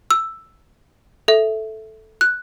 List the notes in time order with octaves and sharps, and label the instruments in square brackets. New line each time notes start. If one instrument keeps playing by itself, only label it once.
[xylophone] E6
A4 E5
F#6